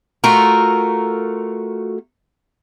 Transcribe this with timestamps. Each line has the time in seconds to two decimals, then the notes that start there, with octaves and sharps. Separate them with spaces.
0.24 A3 F4 F#4 A#4